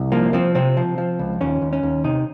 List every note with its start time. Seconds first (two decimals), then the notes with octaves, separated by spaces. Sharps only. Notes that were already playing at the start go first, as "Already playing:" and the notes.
Already playing: C2
0.12 F3 A#3
0.33 F3 C4
0.55 C3 C4
0.77 F3
0.98 F3
1.19 C#2
1.41 D#2 C#4
1.62 D#2
1.73 C#4
1.83 D#2
2.04 C3 D#4